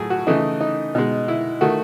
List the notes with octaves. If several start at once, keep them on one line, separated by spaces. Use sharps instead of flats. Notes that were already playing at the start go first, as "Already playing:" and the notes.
Already playing: A2 F#3 A3 G#4
F#4
C#3 E3 A3 D#4
D#4
B2 G#3 D#4
E4
D#3 A3 F#4